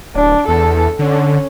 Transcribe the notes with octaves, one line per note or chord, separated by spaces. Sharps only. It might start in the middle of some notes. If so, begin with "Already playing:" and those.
D1 D4
E2 A4
D3 C#4